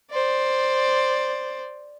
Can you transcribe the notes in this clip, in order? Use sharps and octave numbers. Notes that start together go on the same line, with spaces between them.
C5 D5